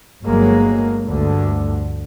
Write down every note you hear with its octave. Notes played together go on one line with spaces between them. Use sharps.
G1 F#3 G#3 A#3
D2 G2 D3